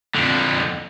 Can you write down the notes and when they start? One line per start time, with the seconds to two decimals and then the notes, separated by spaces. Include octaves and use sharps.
0.16 F2 D3